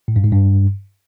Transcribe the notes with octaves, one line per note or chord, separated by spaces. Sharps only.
A2
G2
G#2
G2